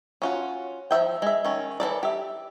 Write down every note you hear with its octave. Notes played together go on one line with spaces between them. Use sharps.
C#4 F4 F#4
F3 F#3 E5 G5
G#3 E5
D#3 C#4
E3 F#3 A4 D5
G4 E5